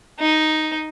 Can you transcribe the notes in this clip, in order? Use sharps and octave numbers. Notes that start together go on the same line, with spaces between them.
D#4